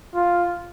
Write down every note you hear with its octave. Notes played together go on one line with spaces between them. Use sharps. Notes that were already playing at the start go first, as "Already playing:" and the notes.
F4